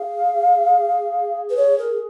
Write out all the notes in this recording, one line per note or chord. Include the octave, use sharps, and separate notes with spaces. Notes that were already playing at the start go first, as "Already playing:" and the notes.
Already playing: G#4 F5
B4
C#5
A#4